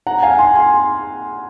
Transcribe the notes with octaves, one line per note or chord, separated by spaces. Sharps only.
F#5 A#5
F5 G#5
G#5 C6
G#5 C6